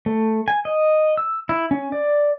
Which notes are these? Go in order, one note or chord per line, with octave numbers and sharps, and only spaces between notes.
A3
G#5
D#5
E6
E4
C#4
D5